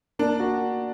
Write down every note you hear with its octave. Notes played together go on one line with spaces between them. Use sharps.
A#3 D4
F#4